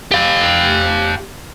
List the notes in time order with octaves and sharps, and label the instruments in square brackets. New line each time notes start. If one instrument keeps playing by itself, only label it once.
[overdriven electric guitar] G4 F5